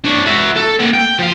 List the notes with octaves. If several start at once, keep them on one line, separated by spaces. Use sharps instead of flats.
D4 C#5
F#4 E5
A4
A#3 F#5
G5
F3 F5